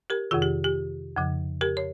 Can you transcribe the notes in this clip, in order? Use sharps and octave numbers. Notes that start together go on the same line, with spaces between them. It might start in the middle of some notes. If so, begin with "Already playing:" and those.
G4 A#4
F2 C3 D#3 F4 G#4
G4
G4
F2 C#3 F3
G4 A#4
C#5